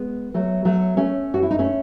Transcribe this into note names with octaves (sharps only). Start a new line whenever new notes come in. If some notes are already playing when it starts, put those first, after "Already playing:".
Already playing: G#3 B3
F#3 A3
F#3 A3
A3 C#4
F#4
E4
D#4
A3 C#4